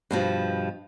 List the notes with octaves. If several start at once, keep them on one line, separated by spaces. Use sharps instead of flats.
G2 B2 F3